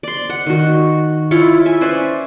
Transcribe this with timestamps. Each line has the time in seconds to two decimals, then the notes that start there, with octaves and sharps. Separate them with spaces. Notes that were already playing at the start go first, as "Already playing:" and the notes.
0.03 D5 C6
0.30 F#5
0.47 D#3 F#4
1.31 E4 F4 C#5
1.66 E5 G#5
1.81 C#4 B4 C5 D5